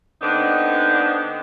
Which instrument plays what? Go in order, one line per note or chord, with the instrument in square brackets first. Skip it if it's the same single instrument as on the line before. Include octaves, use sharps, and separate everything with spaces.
[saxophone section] D3 B3 C4 D4 D#4